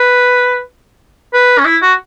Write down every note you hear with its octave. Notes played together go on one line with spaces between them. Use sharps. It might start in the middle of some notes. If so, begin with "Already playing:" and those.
Already playing: B4
B4
C#4
E4
F#4